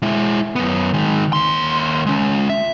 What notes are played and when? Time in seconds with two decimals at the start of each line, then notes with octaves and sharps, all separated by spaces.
0.02 G#3 E4
0.56 F#2 B3
0.94 D#3 G#3
1.33 D#2 C6
2.06 G#3 C#4
2.50 E5